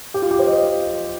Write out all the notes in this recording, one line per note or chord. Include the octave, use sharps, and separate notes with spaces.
G4
F4
G4
C5
D#5
D#5